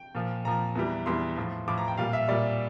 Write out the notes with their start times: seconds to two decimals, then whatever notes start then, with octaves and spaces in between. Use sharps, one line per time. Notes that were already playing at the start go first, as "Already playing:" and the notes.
Already playing: G5
0.15 A#2 F3
0.45 A#2 F3 A#5
0.75 E2 E3 G3
1.06 E2 E3 G3 C6
1.37 A2 F3
1.68 A2 F3 D6
1.78 A#5
1.88 G5
1.97 A#2 G3 F5
2.13 E5
2.28 A#2 G3 D5